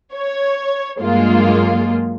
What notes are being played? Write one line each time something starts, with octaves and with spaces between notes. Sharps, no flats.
C#5
G2 F#3 G#3 A#3 F4